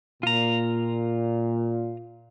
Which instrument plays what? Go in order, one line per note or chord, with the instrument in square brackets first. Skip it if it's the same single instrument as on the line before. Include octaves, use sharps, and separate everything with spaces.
[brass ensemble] A#2 [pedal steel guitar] F4 A#5